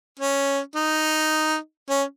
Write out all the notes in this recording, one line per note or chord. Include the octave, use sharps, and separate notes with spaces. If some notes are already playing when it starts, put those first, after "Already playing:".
C#4
D#4
C#4